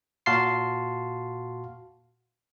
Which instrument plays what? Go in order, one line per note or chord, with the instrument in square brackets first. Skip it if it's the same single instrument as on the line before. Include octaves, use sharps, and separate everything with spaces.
[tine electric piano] A#2 F#4 F5 A5 C6 C7